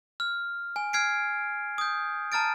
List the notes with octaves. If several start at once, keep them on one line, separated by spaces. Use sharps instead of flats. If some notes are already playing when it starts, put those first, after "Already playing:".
F6
G#5
F6 G#6 C7 D7
D#6 G6
A5 A#5 F6 A6 D7